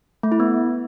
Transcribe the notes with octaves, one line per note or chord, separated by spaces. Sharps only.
A3
E4
B3